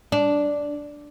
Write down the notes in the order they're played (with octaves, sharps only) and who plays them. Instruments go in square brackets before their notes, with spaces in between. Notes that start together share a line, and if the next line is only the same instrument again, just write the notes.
[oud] D4